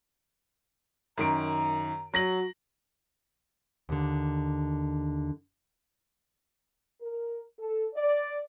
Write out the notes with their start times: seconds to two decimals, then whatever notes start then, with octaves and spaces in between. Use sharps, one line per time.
1.18 F#2 D#3 A#5 D7
2.14 F#3 F#4 A#6 F#7
3.89 D#2 D3
7.01 A#4
7.58 A4
7.94 D5